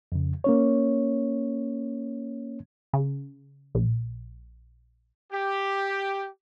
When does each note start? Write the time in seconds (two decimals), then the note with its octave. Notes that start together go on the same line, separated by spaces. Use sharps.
0.12 F2 C#3
0.44 A#3 C#4 C#5
2.93 C#3
3.75 A#1
5.32 G4